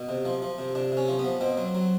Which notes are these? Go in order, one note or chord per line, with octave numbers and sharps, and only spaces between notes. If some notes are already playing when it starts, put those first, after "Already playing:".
Already playing: B2
C3
F3
F3
C3
C3 D4
C3
C#4
F3
B3
F3
B2 C4
F#3
F#3